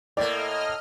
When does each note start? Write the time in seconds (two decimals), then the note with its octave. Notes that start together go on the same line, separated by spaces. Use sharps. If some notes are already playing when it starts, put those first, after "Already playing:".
0.17 A2 A#3 D5 D#5 F6